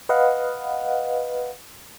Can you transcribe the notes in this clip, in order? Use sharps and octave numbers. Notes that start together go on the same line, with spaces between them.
B4 D#5 F5 F#5